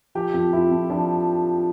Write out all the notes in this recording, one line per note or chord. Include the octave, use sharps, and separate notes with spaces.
F3 G4
F2
F2 E4
F2
F3 D4